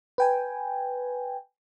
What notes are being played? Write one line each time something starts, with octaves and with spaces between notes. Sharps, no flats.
B4 G5 G#5